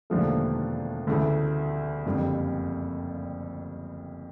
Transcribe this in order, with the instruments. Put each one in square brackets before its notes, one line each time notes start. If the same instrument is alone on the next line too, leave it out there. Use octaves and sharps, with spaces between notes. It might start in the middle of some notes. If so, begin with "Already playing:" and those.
[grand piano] E1 D#2 D3 F3 A3
D2 C#3 E3 A3
F#1 F2 D3 G3